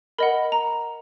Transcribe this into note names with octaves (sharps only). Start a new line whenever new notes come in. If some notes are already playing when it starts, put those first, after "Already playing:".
A#4 D#5 F#5 B5
A#5